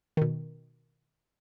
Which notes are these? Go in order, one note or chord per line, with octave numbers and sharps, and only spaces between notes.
B2 D#3